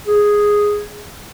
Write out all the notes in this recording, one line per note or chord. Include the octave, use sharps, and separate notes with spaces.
G#4